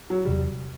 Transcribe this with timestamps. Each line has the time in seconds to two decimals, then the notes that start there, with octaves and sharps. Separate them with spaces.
0.10 F#3
0.25 E2 C3 F#3 G3